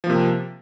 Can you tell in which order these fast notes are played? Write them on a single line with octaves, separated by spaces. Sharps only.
F3 A#3 C3